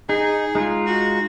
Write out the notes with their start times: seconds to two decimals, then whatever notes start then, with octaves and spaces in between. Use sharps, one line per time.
0.09 D#4 G#4
0.55 G#3 D#4 F4
0.87 F#4